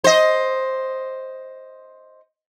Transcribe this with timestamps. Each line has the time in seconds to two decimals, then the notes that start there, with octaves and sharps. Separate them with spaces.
0.04 C5 D#5